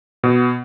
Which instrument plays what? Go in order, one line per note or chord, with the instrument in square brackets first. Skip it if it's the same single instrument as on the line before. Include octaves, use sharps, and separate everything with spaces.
[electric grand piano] B2